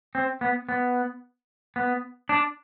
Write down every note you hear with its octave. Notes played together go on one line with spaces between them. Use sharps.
C4
B3
B3
B3
D4